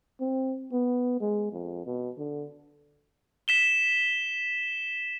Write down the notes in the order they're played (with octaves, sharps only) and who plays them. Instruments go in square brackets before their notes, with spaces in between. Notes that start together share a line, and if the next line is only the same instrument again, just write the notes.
[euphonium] C4
B3
G#3
F2
B2
D3
[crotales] B6 E7 G7